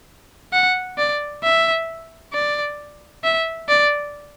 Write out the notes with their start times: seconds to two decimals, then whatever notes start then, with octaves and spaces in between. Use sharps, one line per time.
0.53 F#5
0.98 D5
1.43 E5
2.33 D5
3.24 E5
3.69 D5